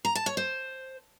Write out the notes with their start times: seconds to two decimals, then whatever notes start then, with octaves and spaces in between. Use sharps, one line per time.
0.05 A#5
0.15 A5
0.26 C#5
0.37 C5